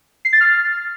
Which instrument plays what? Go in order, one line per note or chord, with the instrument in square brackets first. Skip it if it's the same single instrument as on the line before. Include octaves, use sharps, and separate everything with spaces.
[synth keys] C7
A6
F6